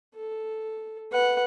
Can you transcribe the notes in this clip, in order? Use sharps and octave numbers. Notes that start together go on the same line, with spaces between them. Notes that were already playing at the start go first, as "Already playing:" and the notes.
A4
B4 F#5